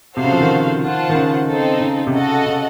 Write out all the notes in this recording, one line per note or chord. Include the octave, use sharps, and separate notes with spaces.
C3 F#4 A4 C5 F5
C#3
F3
D#3
F4 C5 F#5 A5
D#3
C#3
C4 D#4 A4
C#3
C3
C#3 F#4 A4 D#5 F#5
C#3